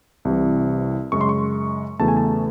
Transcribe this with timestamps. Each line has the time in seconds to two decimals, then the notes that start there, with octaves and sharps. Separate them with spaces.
0.25 C2 C3 E3
1.12 F#2 C#3 G#3 C#6
1.21 C6
1.29 C#6
1.99 E2 C#3 F#3 A3 A5
2.08 G#5
2.17 A5